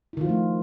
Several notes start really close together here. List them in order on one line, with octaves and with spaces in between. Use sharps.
E4 D#3 F4 F3 A3